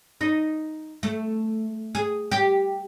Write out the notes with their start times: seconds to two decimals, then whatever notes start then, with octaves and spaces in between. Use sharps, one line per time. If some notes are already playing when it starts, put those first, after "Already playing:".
0.21 D#4
1.03 A3
1.95 G#4
2.32 G4